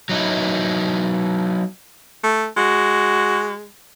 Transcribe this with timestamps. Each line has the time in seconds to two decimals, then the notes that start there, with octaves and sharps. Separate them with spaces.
0.09 F#3 D#4 E4
2.24 A3
2.57 G#3 F#4